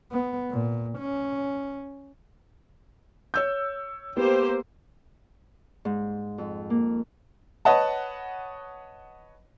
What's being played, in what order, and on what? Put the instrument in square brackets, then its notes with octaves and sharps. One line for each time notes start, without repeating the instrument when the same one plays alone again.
[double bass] B3
A#2
C#4
[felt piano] C#5 E6 G6
[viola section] A#3 G4 C5 [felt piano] B3
[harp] G#2
F2
A#3
[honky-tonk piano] B4 C#5 D#5 F#5 A5